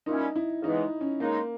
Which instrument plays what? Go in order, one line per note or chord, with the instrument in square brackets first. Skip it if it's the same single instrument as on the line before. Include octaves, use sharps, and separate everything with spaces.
[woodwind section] A#2 G3 C#4 E4 [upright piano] D#4
[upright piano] E4
[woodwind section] C#3 E3 G#3 B3 [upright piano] D#4
[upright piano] C#4
[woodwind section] C#3 G#3 D#4 [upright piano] A#3